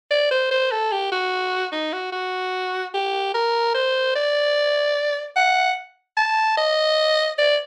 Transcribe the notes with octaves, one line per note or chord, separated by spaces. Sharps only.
D5
C5
C5
A4
G4
F#4
D#4
F#4
F#4
G4
A#4
C5
D5
F#5
A5
D#5
D5